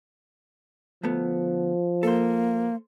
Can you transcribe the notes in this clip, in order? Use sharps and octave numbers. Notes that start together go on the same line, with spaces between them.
D2 F3 A3 B3
A#3 A4 C5